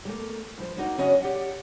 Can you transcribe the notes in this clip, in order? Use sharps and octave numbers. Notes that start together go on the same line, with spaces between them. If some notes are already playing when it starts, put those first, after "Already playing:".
G3 A3 A#3
G2 F3 C5
A#3 D4 D#4 F#4 D5
F#2 C#3 C#4 F#4 C#5 D#5
G4 D5 F#5